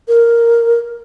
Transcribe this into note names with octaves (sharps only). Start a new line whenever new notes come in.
A#4